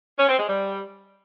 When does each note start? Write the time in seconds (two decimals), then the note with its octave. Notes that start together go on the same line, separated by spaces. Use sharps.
0.19 C#4
0.29 C4
0.39 G#3
0.49 G3